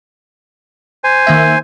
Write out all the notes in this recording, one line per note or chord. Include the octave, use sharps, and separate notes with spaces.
C5 G#5
D#3 A#3 E5